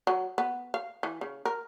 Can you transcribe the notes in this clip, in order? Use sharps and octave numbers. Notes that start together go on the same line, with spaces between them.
F#3
B3
F5
E3
C#3
A#4